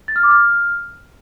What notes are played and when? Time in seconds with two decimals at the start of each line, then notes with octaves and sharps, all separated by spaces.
0.08 A6
0.16 F6
0.23 D6
0.31 F6